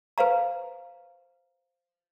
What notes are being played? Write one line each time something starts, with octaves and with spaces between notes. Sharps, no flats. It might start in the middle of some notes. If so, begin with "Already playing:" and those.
B4 C5 F5 A#5